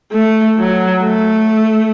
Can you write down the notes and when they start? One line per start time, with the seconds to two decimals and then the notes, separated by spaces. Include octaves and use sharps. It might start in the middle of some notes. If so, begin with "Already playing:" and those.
0.13 A3
0.59 F#3
1.03 A3